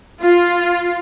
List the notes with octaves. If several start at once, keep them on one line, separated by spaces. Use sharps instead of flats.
F4